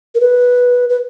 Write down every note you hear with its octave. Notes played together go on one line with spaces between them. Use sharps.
A#4
B4
B4